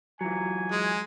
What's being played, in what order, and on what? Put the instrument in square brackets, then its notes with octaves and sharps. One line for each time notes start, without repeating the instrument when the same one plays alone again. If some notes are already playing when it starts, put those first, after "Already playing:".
[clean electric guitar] E3 F#3 [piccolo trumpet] G#5
[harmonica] G#3